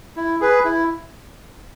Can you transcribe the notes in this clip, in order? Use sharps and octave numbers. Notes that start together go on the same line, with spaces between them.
E4
G#4 B4
E4